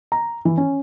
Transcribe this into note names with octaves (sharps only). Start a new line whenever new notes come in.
A#5
E3
C#4